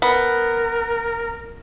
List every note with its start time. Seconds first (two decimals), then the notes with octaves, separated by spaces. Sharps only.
0.02 B3 A#4